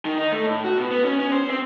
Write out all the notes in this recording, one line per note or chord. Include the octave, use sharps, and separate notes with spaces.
D#3
D#4
A3
A2
F#4
B2
B3
C#4
C#4
C5
C4